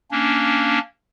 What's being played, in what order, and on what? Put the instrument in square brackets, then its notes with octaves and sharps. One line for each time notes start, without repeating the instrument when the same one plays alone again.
[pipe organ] A#3 C#4 D4